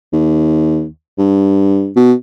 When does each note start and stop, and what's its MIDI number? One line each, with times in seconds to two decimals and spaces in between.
0.13 0.86 39
1.18 1.91 43
1.96 2.13 47